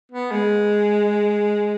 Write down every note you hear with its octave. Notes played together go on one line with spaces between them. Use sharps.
B3
G#3